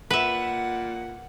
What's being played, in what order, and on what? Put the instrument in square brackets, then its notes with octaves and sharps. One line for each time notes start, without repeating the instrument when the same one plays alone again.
[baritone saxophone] A#2 [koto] B4 E5 [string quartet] F#5